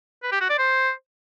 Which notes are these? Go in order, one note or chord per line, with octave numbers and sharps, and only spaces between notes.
B4
G4
F#4
D5
C5